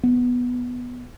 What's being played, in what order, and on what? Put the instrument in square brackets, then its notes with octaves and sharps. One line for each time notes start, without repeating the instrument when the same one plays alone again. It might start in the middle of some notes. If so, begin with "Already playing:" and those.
[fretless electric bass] B3